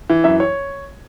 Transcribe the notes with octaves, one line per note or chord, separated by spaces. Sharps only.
E3
F#2 E5
C#5